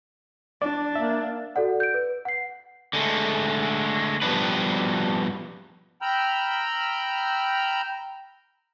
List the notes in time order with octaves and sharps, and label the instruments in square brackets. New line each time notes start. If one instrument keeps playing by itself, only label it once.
[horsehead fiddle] D4 [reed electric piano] D5
[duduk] A#3 [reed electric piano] E5
[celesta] F#4 A4 D5 F#5
G6 D7
B4
F#5 C7
[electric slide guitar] D3 G#3 A3
F3 G3 B3 D4 B4
[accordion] G5 A#5 B5 E6 F6 G6